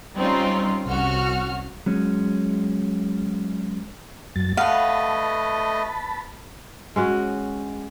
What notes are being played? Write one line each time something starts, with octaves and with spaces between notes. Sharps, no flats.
G3 C4 C#4 D#4 F4
C2 C#4 F#4 F6
F#3 G#3 C#4
F#2 F#3 A6
A3 B4 D#5 F5 F#5 A5 B5
G#3 C#4 F#4